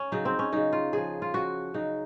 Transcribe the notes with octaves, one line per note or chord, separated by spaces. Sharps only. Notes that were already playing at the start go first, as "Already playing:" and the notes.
Already playing: C#4
C#3 F#3 D#4
C4
C#4
C#3 F#3 D#4
F4
C#3 F3 G#4
F4
C#3 F3 F#4
C#3 F#3 D#4